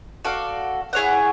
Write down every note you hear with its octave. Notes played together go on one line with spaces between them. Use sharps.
F#4 A4 D5 F5
E4 G#4 C#5 F#5